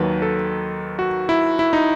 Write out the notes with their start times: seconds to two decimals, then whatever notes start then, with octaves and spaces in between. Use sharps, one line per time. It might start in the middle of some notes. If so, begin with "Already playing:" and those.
Already playing: D#2 D#3 F#3 B4
0.22 A4
0.99 F#4
1.29 E4
1.59 E4
1.73 D#4